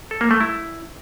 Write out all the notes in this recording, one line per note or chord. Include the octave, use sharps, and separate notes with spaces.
A4
A#3
A3
E4